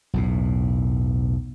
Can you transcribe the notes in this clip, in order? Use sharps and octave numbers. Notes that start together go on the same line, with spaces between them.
B1 E2 A2